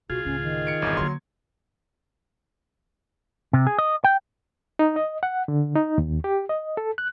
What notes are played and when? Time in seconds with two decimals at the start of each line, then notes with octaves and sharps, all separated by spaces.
0.10 B1 F4 F#4 G#4
0.25 C#2 A2 C#4
0.42 D#3
0.67 C#7 D7
0.82 G1 E2 A#2 D4 G#6
0.97 D3 F#3 A#3 C6
3.53 C3
3.67 G#4
3.78 D#5
4.04 G5
4.79 D#4
4.96 D#5
5.23 F#5
5.48 D3
5.75 D#4
5.98 D#2
6.24 G4
6.49 D#5
6.77 A4
6.98 F#6